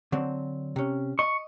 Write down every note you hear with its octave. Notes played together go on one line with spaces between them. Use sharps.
D3 F#3 C4
C3 C#4
D#5 C#6